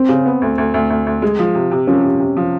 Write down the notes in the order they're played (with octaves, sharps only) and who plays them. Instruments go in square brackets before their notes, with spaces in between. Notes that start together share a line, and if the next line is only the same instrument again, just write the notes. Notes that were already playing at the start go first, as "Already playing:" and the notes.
Already playing: [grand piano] C4
[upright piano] C#3
B3
D2
D2
D2
D2
D2
G#3
F3
C3
C3
[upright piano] F3 [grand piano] C#4
[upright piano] C3
C3
F3